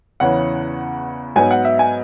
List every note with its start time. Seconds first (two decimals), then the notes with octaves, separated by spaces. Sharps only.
0.20 E2 C#3 E3 C#4 F#5
1.36 G#2 F#3 B3 G#5
1.51 F#5
1.65 E5
1.79 G#5